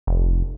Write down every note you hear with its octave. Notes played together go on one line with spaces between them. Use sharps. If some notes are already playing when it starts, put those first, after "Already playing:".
F1